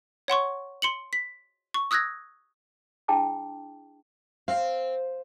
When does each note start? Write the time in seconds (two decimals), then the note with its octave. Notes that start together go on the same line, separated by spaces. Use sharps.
0.28 C#5 F#5 C6 C#6
0.82 C6 C#7 F#7
1.13 B6
1.74 C#6
1.91 D#6 E6 F#6 G#6 A#6
3.08 D4 E4 G#4 G5 A5 D6
4.48 C4 F5